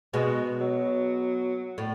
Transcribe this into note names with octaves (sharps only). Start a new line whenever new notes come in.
B2 G#3
F#3
A2